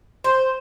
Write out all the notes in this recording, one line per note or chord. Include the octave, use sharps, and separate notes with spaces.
C5